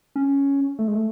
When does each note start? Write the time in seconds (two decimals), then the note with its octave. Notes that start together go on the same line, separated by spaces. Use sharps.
0.16 C#4
0.79 A3
0.88 G#3
0.95 A3